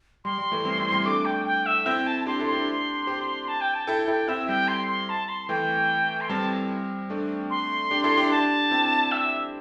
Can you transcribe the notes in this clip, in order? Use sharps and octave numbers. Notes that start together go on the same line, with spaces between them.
G3 C6
G3
E3 A3
G3 C4
C4 E4
G3 C4
A3 D4 D6
G5
G5
E5
C4 E4 G5
A5
A5
D4 G4 C6
E4 A4
C6
D4 G4
G4 C5
A5
G5
A5
E4 A4 G5
E4 A4 G5
C4 E4 E5
G3 G5
C6
C6
A5
C6
E3 A3 G5
C6
G3 C4 A5
A3 D4
C6
D4 G4
E4 A4
D4 G4
D4 G4 A5
C4 E4
E5